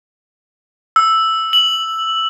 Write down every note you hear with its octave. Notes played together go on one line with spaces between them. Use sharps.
E6
F#7